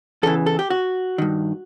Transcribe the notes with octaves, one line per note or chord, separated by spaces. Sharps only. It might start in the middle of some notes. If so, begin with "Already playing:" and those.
E2 C#3 E3 A4
A4
G4
F#4
G2 D#3